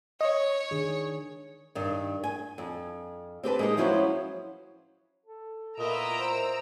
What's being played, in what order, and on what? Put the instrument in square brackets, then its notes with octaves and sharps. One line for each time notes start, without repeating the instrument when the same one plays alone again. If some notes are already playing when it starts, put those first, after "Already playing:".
[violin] C#5 [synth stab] D#5
[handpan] D#3 D4 G#4
[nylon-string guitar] G2 D#3
G#5
F2
C4 G4 B4 A5
G#3 A#3 D#4
F3 F#3 C#4 E4 F#4 C5
[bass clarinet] A4
[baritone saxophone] A#2 [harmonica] B3 E4 D#5 [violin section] A#5 E6 D7
[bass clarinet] C5